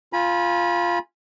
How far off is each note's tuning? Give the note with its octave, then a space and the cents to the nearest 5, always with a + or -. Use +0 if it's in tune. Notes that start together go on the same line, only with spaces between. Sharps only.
F4 +0 G#5 -10 B5 -30